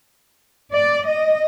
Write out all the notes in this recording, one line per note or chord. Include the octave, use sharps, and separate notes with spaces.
D5
D#5